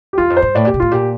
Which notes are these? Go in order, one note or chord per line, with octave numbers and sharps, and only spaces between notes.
G4
E2 F4
F2
C5
G2
A2 D5
A#2 G4
C3
A2 F4
A#2 G4